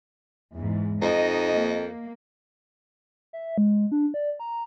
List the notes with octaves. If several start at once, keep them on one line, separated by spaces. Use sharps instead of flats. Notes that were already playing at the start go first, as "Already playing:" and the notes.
E2 G#2
F2 D#4 D#5
A#3
E5
G#3
D4
D5
A#5